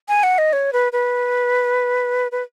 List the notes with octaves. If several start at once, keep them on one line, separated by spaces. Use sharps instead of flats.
G#5
F#5
D#5
C#5
B4
B4
B4